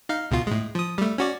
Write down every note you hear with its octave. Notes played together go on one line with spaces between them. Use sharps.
D#4 F5
C#2 B2 F4
A2 G#3
F3 D#6
G3 A3
C#4 F#4 D5